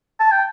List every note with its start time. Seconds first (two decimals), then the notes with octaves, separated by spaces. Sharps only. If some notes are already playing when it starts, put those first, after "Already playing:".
0.20 A5
0.32 G5